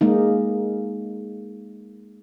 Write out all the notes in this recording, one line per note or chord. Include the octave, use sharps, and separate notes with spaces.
G#3 A#3 D#4